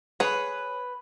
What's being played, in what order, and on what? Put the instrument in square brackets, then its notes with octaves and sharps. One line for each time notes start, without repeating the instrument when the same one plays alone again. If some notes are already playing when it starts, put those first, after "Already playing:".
[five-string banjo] G#4 C#5 [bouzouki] B4